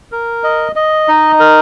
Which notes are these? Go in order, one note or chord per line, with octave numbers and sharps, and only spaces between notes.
A#4
D#5
D#5
D#4
A#4